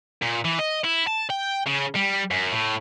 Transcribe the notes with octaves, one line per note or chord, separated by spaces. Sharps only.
A#2
E3
D#5
E4
A5
G5
C#3
G3
F#2
A2